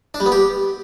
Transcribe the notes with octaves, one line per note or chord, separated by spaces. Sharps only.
D4
G3
B3
G4